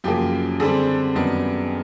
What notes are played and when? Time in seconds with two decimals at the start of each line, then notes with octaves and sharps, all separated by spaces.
0.04 F#2 C#3 F3 A#3 G4
0.60 D3 G3 C4 G#4
1.15 F#2 D#3 G3 B3